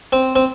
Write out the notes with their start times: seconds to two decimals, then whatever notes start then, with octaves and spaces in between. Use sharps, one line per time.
0.13 C4
0.36 C4